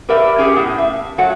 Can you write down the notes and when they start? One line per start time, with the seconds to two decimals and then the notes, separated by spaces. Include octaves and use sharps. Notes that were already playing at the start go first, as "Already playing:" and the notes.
0.09 G4 A#4 B4 D5 E5
0.38 C#4 G4 G#4
0.56 A2 B3
0.78 E5
1.18 F#3 A3 F#4 F#5